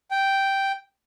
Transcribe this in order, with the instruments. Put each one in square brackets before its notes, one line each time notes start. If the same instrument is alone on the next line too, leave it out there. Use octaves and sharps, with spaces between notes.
[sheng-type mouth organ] G5